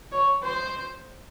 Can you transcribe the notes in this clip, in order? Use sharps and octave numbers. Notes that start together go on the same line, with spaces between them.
C#5
C5